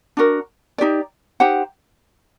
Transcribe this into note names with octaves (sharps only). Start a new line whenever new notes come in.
D4 F#4 A#4
D#4 G4 D5
D#4 G4 C5 F#5